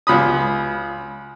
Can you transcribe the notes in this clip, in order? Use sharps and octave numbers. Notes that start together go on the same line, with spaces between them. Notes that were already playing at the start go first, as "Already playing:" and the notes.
C#2 B5 D#6